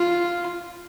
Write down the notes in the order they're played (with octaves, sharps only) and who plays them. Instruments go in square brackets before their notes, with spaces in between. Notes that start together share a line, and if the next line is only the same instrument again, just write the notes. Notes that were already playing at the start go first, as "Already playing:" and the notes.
Already playing: [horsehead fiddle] F4